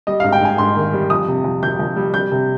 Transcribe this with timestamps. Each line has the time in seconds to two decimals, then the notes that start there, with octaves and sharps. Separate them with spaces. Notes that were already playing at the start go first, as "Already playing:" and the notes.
0.07 G3 D#5
0.20 G#2 F5
0.32 G5
0.41 G#2 G#5
0.58 G#2 C6
0.75 D#3
0.93 G3
1.10 F2 D#6
1.28 C3
1.44 F2
1.63 F2 G6
1.80 F2
1.96 G3
2.14 G3 G6
2.32 C3